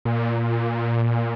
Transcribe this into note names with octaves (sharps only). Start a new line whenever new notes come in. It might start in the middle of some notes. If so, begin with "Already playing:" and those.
A#2